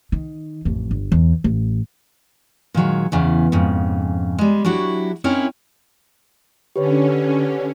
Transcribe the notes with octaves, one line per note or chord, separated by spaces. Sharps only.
D#3
A1 F2
G1
E2
A1
A#2 D#3 F#3 G#3
E2 C#3 E3
F2 G#2 C#3
G3 G#3
F#3 D4 E4 F#4 G4
C4 C#4 D#4 E4 A#4 C#5
D3 C#4 G4 B4 C#5